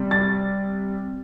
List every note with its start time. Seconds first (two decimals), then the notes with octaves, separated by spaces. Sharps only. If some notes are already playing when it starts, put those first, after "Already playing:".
Already playing: C3 G3
0.11 A6